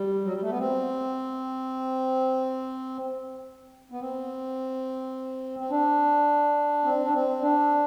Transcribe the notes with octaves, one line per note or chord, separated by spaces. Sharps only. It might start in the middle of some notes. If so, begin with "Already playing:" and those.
Already playing: G3
F#3
G3
A3
B3
C4
B3
C4
C4
D4
C4
D4
C4
D4